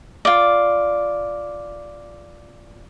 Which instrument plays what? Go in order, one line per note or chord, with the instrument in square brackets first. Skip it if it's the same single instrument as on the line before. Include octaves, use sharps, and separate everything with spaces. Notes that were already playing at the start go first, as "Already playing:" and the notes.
[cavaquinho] F4 D5